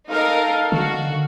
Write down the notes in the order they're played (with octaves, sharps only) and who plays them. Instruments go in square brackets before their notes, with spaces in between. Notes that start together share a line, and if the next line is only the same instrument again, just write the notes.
[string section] D#4 A#4 [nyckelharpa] A4 [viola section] F5
[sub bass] D3 [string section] F#4